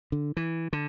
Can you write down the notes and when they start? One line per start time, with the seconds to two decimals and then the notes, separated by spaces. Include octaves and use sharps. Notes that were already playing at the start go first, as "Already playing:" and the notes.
0.12 D3
0.37 E3
0.73 D3